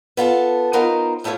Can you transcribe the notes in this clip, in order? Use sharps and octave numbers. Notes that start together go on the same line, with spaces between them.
B3 F4 A4 A5
B3 D#4 F4 A#4 C5
A2 A3 E4 F4 C#5